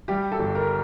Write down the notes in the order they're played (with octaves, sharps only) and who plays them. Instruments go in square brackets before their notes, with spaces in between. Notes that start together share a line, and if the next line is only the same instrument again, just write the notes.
[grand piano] G3 G4
A4
G1
A#4